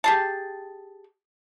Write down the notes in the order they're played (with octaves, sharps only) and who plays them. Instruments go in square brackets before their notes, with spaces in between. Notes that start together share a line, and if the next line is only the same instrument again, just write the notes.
[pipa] G4 G#4 A5